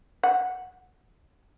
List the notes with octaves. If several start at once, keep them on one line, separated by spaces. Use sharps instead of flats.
F#5